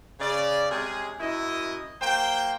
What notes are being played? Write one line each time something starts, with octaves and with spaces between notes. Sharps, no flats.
C#3 D5
C3 G#3 C#4 G#4
F#2 E4 D#5
F#3 A#3 C5 G5